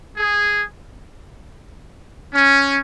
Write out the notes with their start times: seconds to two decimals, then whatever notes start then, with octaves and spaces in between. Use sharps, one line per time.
0.16 G#4
2.33 C#4